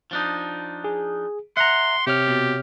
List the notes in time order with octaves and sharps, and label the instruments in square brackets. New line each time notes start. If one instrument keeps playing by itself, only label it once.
[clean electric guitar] F3 D4 D#4
[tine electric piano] G#4
[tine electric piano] E5 A#5 [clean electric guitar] F#5 [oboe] C6
[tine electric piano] C3 C#5 F6 [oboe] G4
[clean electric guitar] B2